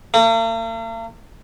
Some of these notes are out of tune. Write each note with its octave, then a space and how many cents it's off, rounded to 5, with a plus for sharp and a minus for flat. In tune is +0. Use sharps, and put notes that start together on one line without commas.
A#3 -45